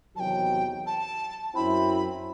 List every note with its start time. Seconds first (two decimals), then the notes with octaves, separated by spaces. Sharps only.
0.16 E2 C3 D#3 F#3 G5 A5
0.86 A5
1.55 F#2 F#3 C4 E4 B5